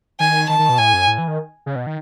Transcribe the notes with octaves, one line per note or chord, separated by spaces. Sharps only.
D#3 G#5
D#3 A5
D#3
B2
A2 G#5
F#2
A2
E3
D#3
C#3
B2
D#3